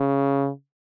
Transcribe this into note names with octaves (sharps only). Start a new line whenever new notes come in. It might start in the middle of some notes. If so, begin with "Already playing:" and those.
Already playing: C#3